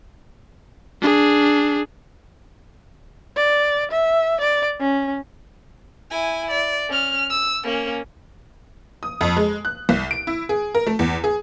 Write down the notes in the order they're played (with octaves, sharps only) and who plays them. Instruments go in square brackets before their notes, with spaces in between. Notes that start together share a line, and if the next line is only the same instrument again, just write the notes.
[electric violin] D4 G#4
[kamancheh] D5
E5
D5
C#4
[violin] E4 G#5
D5
C#4 F6
E6
A#3 C#4
[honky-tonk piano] D#6
F2
G#3
F#6
C2
D7
E4
G#4
A#4
A3
E2
G#4